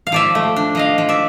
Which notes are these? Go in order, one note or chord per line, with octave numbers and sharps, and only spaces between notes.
F5
F3 D5 E5
A3
D4
F3 D#5 F5
F3
D5 E5